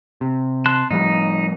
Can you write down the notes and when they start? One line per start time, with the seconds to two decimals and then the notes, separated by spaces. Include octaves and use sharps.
0.21 C3
0.66 A5 C6 F#6
0.91 A2 F3 G3 D#4